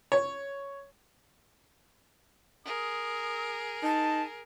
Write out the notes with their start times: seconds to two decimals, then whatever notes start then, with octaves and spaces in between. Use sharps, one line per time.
0.12 C#5
2.65 G#4 A#4 D#6
3.83 D#4 A5